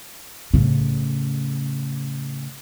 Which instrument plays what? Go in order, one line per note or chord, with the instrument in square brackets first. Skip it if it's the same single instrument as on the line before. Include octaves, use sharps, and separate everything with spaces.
[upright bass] A2 C#3